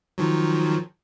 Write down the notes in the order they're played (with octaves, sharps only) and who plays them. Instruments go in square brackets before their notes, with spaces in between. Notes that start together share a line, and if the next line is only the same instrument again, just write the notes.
[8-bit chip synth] D#3 F3 F#3